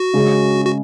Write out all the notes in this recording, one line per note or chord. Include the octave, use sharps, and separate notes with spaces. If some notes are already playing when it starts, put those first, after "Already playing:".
Already playing: F#4
C#3 G#3 C#4 G#4
F#4